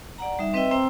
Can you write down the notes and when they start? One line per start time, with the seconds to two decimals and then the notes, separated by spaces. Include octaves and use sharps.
0.18 D5 F#5 A#5
0.39 G3 D#4 E5
0.54 C4 B4 D#5 E5 G5 E6
0.71 C4 C5 G5 A#5 E6